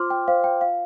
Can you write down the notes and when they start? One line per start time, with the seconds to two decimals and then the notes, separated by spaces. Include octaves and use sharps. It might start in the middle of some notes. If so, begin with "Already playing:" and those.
Already playing: F4 C5 C6 D6 F6
0.10 G5
0.28 C5 F5
0.44 G5
0.61 F4 F5